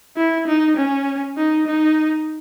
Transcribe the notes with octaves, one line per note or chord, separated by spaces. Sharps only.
E4
D#4
C#4
D#4
D#4